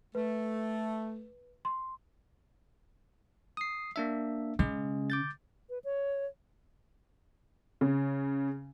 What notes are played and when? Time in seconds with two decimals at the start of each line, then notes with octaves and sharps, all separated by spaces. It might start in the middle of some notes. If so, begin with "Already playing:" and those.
0.15 A3 B4
1.65 C6
3.57 D#6 C7
3.96 A#3 D4 E5
4.59 C#3 G#3 G#4
5.10 D6 G6 A6
5.70 B4
5.84 C#5
7.81 C#3